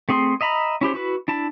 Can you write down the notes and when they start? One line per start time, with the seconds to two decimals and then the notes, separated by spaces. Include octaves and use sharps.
0.09 A3 C4 G#4 C6
0.41 D#5 E5 A#5 B5
0.81 C#4 E4 G4 C5
0.94 E4 F#4 B4
1.28 D4 E4 A5